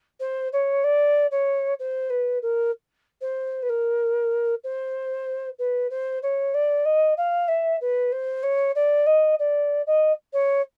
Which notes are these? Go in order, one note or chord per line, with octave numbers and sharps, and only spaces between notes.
C5
C#5
D5
C#5
C5
B4
A#4
C5
B4
A#4
C5
B4
C5
C#5
D5
D#5
F5
E5
B4
C5
C#5
D5
D#5
D5
D#5
C#5